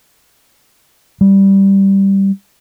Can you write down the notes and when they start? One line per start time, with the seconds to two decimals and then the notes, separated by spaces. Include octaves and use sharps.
1.21 G3